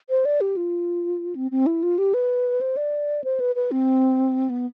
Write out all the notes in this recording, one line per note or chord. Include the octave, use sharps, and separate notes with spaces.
C5
D5
G4
F4
C4
C4
E4
F4
G4
B4
C5
D5
C5
B4
B4
C4
B3